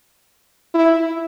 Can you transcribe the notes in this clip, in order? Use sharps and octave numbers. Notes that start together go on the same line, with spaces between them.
E4